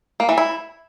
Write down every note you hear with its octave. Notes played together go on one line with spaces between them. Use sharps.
A#3
E3
E4